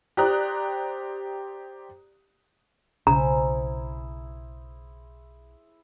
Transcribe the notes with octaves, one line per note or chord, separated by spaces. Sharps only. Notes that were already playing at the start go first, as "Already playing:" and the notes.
G4 C5 D5 A#5 D#6 F#6
B1 C#3 E4 G#4 C5 A#5